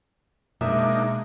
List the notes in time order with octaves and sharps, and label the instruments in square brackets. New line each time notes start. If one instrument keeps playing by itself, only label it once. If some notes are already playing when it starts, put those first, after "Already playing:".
[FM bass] B2 [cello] G#3 [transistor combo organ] A#3 D4 D#4 [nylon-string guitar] E5